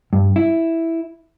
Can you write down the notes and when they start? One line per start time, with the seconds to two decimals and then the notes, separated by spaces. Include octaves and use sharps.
0.13 G2
0.36 E4